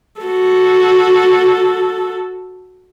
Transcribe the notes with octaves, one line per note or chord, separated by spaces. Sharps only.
F#4 A4